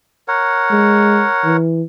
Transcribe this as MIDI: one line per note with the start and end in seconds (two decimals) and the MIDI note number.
0.28 1.57 70
0.28 1.57 73
0.28 1.57 78
0.71 1.25 56
1.45 1.83 52